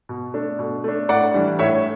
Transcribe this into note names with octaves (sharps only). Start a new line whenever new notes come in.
B2
A3 D4
B2
A3 D4
A2 D5 F#5
E3 G3 D4
A2 C#5 E5